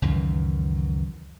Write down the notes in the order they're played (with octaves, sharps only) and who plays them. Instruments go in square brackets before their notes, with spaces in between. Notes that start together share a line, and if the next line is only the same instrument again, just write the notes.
[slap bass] C#2 F#2 D#3 E3